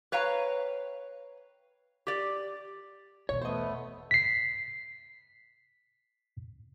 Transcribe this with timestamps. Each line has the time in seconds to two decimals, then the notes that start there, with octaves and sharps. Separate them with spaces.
0.12 B4 C#5 F5 G5 A#5
2.07 G4 D5
3.29 E2 B2 C#5
3.42 A3 B3 C5 D#5
4.11 B6 C7